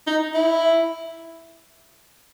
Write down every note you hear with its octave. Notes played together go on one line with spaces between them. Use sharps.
D#4
E4